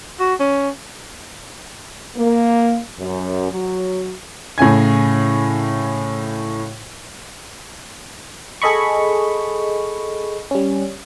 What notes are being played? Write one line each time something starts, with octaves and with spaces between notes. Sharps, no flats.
F#4
C#4
A#3
F#2
F#3
A2 C#3 G#5 G#6
G#4 A4 D#5 B5 C#6
G3 C#4